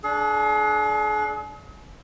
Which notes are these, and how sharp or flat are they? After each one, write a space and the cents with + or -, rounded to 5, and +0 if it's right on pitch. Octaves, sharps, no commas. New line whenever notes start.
D4 +0 G#4 +40